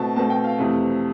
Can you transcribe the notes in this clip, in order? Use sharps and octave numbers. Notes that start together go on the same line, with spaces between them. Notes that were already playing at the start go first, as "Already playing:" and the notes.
Already playing: B2 A3 C4 A5
B2 A3 C4 A5
G5
F5
F2 C3 E3 A3